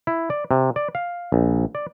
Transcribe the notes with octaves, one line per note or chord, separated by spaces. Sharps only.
E4
D5
C3
D5
F5
A#1
D5